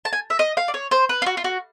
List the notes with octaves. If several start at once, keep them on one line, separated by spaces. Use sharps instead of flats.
A5
G#5
E5
D#5
F5
D5
C#5
C5
B4
F4
F#4
F4
F#4